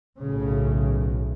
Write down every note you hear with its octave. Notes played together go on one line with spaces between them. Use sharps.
B1 A2 C#3